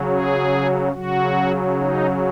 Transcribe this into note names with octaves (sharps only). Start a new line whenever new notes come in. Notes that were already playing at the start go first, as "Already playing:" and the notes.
Already playing: C#3 F#3
G#4
C#3 F#3 F#4
D#4